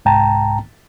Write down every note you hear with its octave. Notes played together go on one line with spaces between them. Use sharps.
C2 G#2 G5 A5 A#5